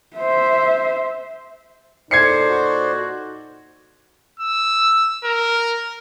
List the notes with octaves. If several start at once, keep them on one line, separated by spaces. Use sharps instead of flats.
C5 E5
A#2 D#4 A4 C5 D5 G#6 C7 C#7
F#4
E6
A#4